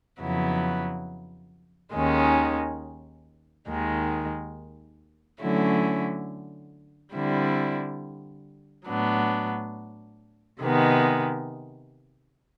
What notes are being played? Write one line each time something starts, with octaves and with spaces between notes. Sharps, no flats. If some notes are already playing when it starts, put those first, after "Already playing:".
F2 C#3 F#3 B3 E4
D#2 D#3 G#3 C#4
D#2 D#3 G#3
D3 F#3 A3 C#4 E4
D3 G3 C4 E4
A2 F#3 B3 D4
C3 D#3 G#3 B3